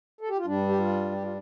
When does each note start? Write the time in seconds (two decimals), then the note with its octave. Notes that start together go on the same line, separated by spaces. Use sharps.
0.21 A4
0.29 G4
0.38 F4
0.46 G2 G3 D4
0.69 G4
0.78 F4
1.12 G4
1.22 F4